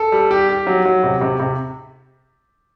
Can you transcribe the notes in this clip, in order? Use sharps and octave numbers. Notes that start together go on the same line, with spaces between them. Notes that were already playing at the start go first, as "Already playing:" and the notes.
Already playing: A4
G3
G4
G4
F#3
F#3
C3
C3
C3